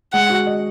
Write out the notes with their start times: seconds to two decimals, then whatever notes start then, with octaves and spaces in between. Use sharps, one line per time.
0.13 G#3 F#5
0.30 F#4
0.47 D#5